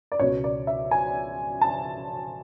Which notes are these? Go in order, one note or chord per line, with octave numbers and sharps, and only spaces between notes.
D5
C#2 B2 C#5
D5
E5
G#5
A5